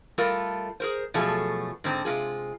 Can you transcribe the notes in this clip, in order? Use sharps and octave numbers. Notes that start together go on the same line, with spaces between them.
G3 A3 F4 A4 A#4
G#4 A#4 C5
B2 F3 F#3 A3 G#4 A4
G#2 D3 C4
C3 G#3 F4 G#4